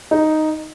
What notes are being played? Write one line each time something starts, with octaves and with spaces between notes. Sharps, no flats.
D#4